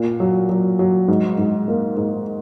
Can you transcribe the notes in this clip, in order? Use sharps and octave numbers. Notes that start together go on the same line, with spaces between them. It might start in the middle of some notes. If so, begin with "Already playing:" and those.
Already playing: A#2
F#3
F#3
F#3
G#2
G#2
A#3
G#2